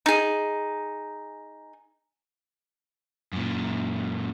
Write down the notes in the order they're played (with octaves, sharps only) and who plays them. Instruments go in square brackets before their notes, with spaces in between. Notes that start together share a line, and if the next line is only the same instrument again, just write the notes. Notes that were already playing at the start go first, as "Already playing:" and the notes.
[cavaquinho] D#4 G#4
[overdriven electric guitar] F#2 A#2